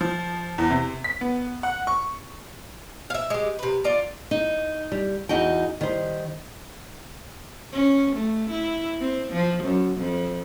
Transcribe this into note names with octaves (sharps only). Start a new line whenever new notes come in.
F3
E2
C3
B6
B3
F#5
C#6
E5 F5
G#3 G4
C3 B4
F4 D5 A#5
D#4
G3
E2 D#4 F#4 G5
D#3 G3 C5
C#4
A3
E4
C4
F3
F#2
F2